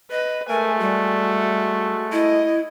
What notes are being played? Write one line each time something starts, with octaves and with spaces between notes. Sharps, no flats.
B4 D#5
G#3 A3 A#4 G#5
G3 F#4
E4 D#5